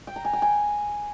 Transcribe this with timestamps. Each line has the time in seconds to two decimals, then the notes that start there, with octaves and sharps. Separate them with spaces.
0.07 G5
0.16 A#5
0.25 G#5
0.33 G5
0.42 G#5